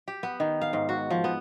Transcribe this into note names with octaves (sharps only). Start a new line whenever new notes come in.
G4
B3
D#3
F5
G#2
F#4
F3
B3